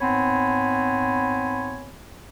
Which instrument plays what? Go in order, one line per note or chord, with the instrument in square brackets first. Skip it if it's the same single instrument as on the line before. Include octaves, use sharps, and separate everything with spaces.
[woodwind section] G#2 B3 C4 C#5 G#5 B5